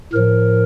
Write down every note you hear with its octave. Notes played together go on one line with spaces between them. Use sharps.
A2 F3 A#4